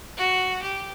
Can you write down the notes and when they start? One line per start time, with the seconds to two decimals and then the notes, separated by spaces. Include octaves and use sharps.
0.17 F#4
0.62 G4